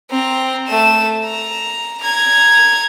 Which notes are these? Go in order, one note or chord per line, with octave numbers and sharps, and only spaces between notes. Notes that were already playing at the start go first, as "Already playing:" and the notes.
C4 A#5
A3 E7
A#5
A#5 G#6